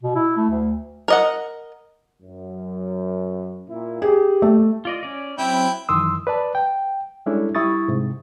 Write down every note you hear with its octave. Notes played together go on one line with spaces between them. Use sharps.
B2
E4
A3
D2
A#4 D#5 F#5
F#2
A#2 E4
G4 G#4
A3
F4 D5 D#5
C#4 D5
F#3 C4 E4 G5
F#2 D#3 E3 C6 D#6 E6
B4 D5 A5
G5
G3 G#3 C#4 D4 E4 A4
G3 E4 C#6 D#6 A6
G#2 C3